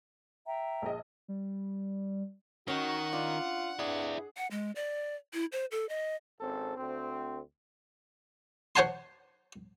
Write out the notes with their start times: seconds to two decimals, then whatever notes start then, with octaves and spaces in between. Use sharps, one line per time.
0.47 E5 G5 A#5
0.82 A#1 G#4 D#5
1.28 G3
2.68 D#3 C#4 D#4 F#4 F#5
3.13 D4 F4
3.79 G2 E4 G#4 D5
4.37 F#5
4.51 G#3
4.75 D5
5.34 E4
5.52 C5
5.71 A4
5.89 D#5
6.41 G#1 C4 C#4 A4
6.77 D2 C4
8.76 C5 C#5 F#5 G#5 A5 C6